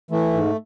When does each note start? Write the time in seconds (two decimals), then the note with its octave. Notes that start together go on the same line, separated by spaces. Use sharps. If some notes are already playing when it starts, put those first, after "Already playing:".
0.11 E3 A3
0.33 G#2